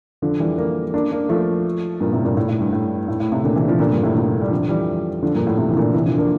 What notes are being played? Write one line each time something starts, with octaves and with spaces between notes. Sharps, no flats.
D3 F3
E3 G3
G3 A#3
A#3 D4
A#3 D4
F3 A3
G2 A#2
A2 C3
G2 A#2
A2
A2
G2
A2
A2
A2
A2 C3
A#2 D3
C3 E3
D3 F3
A#2 D3
G2 A#2
A2 C3
A#2 D3
G3
D3 F3
E3 G3
D3 F3
G2 A#2
A2
A2 C3
E3
A#2 D3
C3 E3
D3 F3
A#3 D4